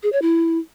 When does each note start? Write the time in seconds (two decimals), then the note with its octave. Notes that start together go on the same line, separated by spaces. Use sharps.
0.03 G#4
0.12 C#5
0.22 E4